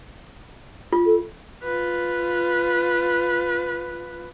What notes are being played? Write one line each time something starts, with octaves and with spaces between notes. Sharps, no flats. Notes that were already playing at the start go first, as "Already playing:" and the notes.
F4
A4
F4 B4